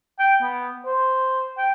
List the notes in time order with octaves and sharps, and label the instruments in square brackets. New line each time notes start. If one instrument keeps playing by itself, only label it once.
[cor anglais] G5
B3
C5
G5